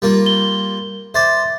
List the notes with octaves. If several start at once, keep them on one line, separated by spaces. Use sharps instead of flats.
G3 A#3 F4
G7
C5 D5 E5 C6 A6